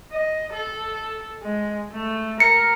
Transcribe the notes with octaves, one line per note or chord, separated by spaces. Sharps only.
D#5
A4
G#3
A3
A#4 C#7